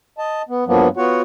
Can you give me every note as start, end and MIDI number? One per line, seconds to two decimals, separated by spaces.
0.18 0.42 75
0.18 0.42 81
0.49 0.64 59
0.67 0.88 43
0.67 0.88 53
0.67 0.88 54
0.67 0.88 58
0.67 0.88 59
0.97 1.22 59
0.97 1.22 65
0.97 1.22 66
0.97 1.22 73
0.97 1.22 78